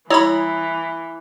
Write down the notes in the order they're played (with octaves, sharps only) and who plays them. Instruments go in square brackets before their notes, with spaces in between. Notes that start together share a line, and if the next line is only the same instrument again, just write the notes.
[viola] E3 [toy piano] E4 D#6 E6 [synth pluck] C#5 B5